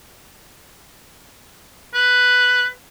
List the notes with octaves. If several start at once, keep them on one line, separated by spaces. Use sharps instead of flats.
B4